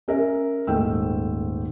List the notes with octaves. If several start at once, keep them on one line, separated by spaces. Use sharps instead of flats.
C#4 A#4 E5
D#1 G#2 A3 G5 E6